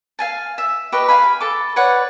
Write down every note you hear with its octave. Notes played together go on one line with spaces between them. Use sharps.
F5 G#5 A5
E5
G4 B4 D#5 C#6
F5 G#5 B5
A4 D6
B4 C#5 D5 F#5